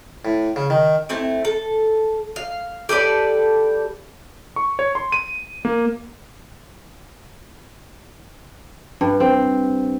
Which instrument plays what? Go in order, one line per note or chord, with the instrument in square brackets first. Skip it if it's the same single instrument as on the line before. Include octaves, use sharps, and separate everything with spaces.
[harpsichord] A2
C#3
D#3
[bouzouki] A3 C4 E4
A4
F5
G4 A4 B4 D5
[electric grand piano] C#6
C#5
C6
D#7
A#3
[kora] G2
C4